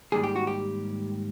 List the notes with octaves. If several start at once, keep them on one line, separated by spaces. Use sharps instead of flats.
G#2 D#3 G3 A#3 G#4
G4
F#4
G4